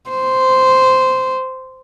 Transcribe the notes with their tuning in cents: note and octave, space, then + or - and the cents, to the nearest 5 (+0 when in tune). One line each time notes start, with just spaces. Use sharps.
C5 -10